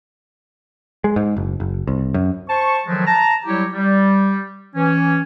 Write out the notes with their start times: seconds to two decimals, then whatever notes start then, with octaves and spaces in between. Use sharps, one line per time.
1.04 G#3
1.16 G#2
1.37 F#1
1.60 F#1
1.87 C2
2.14 F#2
2.49 C5 A5 C#6
2.87 D#3 F3 F#3 G#3 A3
3.06 A5 A#5
3.46 F#3 G3 E4 G4 C#5
3.74 G3
4.75 E3 C#4